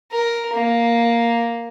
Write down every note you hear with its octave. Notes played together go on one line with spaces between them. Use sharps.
A#4
A#3